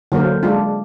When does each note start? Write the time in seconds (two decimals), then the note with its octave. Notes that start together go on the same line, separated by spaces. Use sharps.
0.12 D3 F#3 A#3 A#4 C5
0.43 G#3 D4 F4